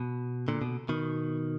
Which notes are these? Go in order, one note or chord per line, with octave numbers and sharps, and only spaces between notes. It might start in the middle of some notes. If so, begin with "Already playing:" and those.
Already playing: B2
A#2 D3
B2
B2 D#3